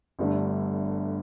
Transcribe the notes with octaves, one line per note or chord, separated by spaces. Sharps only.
G1 G2 D3 A3